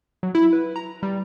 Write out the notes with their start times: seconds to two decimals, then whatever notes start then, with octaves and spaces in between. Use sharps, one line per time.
0.23 F#3
0.35 E4
0.53 B4
0.76 A#5
1.03 G3